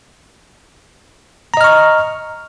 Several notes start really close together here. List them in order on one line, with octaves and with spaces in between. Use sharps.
A#5 D#5 F6 C#6